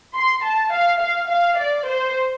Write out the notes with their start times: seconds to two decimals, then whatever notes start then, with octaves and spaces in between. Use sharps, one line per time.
0.15 C6
0.44 A5
0.73 F5
1.01 F5
1.30 F5
1.59 D5
1.88 C5